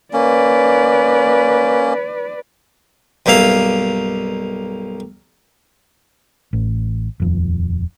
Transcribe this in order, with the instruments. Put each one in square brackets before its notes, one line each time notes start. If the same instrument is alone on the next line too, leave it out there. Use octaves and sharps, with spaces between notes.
[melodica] A#3 C#4 [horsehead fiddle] B4 D5
[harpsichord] B1 G2 A#3 E5 F5
[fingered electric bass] A1
D#1 F2